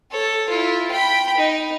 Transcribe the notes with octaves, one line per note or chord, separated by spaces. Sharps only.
A4 C#5
E4 F4
G5 B5
D#4